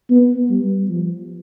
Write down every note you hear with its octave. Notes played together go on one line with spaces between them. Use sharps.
B3
G3
F3